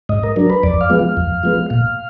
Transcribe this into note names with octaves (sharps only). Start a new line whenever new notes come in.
G#2 D#5
A#4
F#3 D4 A#4
B4
F2 D5
F5
F3 G#3 B3
F5
F2
F3 G#3 B3
A#2 F5